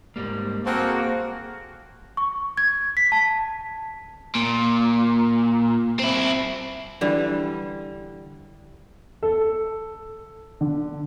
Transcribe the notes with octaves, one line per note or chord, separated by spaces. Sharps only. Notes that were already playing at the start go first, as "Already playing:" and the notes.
G#2 G3 A#3
A#3 C4 F#4 G#4 A4
C#6
G#6
B6
A5
A#2
C4 E4
D3 E3 G3
A4
D3